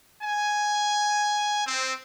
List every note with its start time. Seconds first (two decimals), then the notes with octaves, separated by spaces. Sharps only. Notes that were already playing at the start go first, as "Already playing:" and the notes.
0.22 G#5
1.67 C4